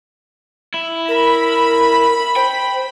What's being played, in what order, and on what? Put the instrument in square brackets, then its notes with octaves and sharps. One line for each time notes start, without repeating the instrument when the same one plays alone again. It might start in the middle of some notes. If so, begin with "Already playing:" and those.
[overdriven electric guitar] E4
[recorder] A#4 [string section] B5
[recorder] C5 [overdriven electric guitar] G5